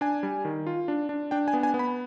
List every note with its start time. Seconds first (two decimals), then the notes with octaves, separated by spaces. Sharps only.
0.01 D4 G#5
0.23 G3
0.45 D#3
0.67 F4
0.88 D4
1.09 D4
1.31 D4 G5
1.48 G#5
1.53 B3
1.63 G#5
1.74 B3
1.79 B5